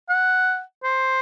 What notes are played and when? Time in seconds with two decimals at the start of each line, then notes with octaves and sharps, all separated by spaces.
0.09 F#5
0.83 C5